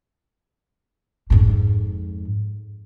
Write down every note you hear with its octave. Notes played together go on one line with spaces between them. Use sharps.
F2 G#2